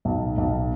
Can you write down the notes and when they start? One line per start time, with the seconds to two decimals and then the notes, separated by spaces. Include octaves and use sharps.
0.05 B1
0.38 B1